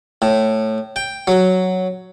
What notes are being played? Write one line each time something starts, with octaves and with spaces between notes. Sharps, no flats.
A2
G5
F#3